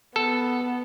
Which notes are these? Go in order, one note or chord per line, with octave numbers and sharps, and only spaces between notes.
B3 A4